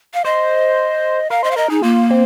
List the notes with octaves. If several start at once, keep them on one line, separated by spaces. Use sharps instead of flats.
F5
C5 D#5
A#4 F5
C5 D#5
F5
A#4 D#5
D#4 G#4
A#3 F4
C4